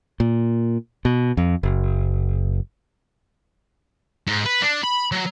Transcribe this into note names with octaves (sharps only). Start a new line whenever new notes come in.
A#2
B2
F2
F#1
G#2
B4
D4
B5
F#3